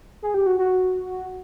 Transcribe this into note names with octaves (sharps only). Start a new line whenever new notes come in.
G#4
G4
F#4
F#4